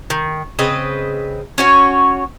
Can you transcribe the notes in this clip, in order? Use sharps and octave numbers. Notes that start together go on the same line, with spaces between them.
D#3
C#3 C4 B4 D#5
C#4 F#4 C#5